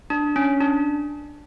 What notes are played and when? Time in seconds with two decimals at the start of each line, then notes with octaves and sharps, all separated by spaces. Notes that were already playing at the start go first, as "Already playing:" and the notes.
0.10 D4
0.36 C#4
0.61 D4